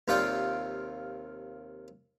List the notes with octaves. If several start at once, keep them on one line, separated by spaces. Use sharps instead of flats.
D#2 C3 F4 D5 G5